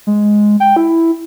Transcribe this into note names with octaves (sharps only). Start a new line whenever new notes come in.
G#3
G5
E4